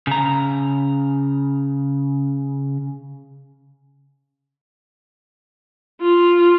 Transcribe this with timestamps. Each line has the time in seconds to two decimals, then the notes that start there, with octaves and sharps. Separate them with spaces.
0.07 C#3 A#5
6.01 F4